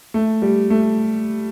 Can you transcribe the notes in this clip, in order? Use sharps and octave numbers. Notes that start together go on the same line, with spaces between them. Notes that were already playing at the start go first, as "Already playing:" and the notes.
A3
G3
A3